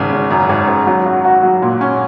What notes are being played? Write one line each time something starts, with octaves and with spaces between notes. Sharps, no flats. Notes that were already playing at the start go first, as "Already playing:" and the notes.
Already playing: G#1 C#3
C#3
F#2
G#1
G#1
F#3
F#4
F#4
F#3
A#2
C#4